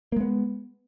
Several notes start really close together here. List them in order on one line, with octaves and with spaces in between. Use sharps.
A#3 G#3 B3